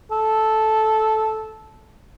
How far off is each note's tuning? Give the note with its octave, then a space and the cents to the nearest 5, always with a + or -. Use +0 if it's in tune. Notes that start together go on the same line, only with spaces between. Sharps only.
A4 -10